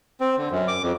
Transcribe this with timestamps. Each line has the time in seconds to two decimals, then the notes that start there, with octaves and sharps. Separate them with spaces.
0.20 C4
0.37 D3
0.51 F#2
0.68 D6
0.82 F2